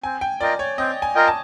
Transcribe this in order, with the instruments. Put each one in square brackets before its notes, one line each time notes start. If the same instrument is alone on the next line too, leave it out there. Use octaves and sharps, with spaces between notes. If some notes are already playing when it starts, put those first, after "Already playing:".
[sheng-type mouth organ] C4 [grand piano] G#5
[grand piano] G5
[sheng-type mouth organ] F4 A#4 D#5 G5 [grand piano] D5
[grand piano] C#5
[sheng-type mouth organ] C4 [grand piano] D#5
[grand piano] G#5
[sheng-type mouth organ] F4 A#4 D#5 G5
[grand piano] A5